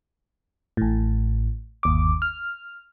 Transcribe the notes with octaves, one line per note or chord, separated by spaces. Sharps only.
A1 A2
G1 D#2 D6
F6